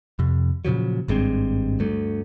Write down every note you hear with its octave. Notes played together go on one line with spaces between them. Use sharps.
F2 C3
A#2 C#3 F3 F#3
G#1 G2 G#3 C4
D2 G2 A3